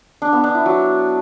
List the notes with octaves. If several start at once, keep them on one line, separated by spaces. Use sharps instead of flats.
D4
B3
D4
E4
F#3